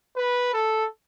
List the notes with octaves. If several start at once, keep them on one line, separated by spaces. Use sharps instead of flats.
B4
A4